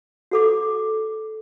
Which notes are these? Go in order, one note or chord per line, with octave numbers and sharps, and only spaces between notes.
F#4 A4 D6